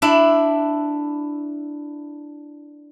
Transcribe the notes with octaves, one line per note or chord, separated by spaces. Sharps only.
D4 E4